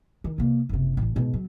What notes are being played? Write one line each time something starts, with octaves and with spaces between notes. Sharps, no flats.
D#3
C3 A#3
F#1 C3
A1 A2
G#2 B2
F#3